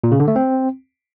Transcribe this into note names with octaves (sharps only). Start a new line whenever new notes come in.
A#2
C#3
D3
A3
C4